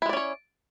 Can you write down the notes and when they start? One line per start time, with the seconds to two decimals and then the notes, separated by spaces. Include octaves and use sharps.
0.02 E4
0.06 G#3
0.09 D5
0.13 C#4
0.17 C#5